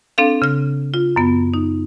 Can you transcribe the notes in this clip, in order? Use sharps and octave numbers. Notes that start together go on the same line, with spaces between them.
C4 D4 A4 F5
C#3 F6
F4
F#2 B3
D#4